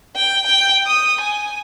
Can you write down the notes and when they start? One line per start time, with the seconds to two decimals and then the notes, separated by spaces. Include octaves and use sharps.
0.16 G5
0.46 G5
0.87 D#6
1.21 G#5